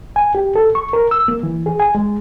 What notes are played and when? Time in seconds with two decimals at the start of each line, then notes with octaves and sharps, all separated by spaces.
0.16 G#5
0.35 G4
0.56 A4
0.75 C#6
0.93 A#4
1.11 E6
1.28 A#3
1.43 E3
1.66 G#4
1.80 G#5
1.95 G#3